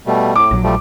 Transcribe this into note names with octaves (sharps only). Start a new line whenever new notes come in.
B2 G3 A3
A2 D6
A#1 F#3
F3 G3 A3